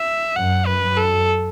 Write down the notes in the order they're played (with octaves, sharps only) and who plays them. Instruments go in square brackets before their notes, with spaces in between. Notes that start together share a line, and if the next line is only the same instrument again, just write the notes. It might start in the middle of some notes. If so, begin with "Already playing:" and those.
Already playing: [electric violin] E5
[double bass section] F#2 [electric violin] F#5
[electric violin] B4
[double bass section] F#2
[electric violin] A4